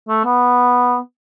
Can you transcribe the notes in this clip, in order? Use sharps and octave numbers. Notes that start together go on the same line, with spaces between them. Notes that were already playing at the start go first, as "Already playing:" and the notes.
A3
B3